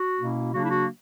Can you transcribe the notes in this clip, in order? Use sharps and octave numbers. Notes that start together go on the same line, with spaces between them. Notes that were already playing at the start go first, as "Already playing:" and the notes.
Already playing: F#4
B2 A#3 C#4 E4
C#3 F#3 A#3 D4 F#4
E4
F#4